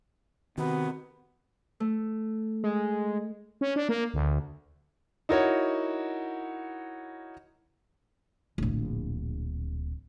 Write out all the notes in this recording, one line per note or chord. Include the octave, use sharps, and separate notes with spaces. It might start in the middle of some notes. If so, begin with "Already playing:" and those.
C3 D#3 B3 F#4
A3
G#3
C#4
D4
A#3
D2
D#4 E4 F#4 A#4 C#5
D1 A#1